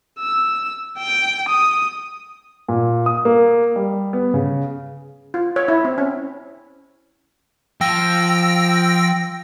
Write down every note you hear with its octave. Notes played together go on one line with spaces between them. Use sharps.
E6
G5
D#6
A#2
D#6
A#3
G3
B3
C#3
F4
C#5
E4
C4
C#4
F3 G5 E6 A#6